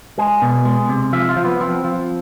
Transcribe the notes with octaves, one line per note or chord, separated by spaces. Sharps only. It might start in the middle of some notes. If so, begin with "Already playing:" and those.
G#3 G#4
B2
G#3
C3
F3 E5
F4
F3
B3
F3 C4
F3